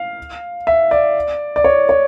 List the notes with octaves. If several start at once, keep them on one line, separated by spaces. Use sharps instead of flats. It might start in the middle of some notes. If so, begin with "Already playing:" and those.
Already playing: F5
E5
D5
D5
C#5
C#5